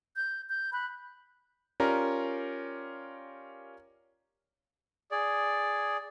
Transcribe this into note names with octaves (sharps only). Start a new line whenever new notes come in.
G6
G6
B5 F#6
C#4 F4 G4 A#4 D5 A#5
G#4 D5